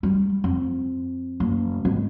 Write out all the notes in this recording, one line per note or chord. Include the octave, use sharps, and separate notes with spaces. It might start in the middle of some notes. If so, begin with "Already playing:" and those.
G3
F2
F#1
G#1